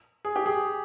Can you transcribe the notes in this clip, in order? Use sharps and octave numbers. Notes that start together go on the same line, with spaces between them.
G#4
G4
G#4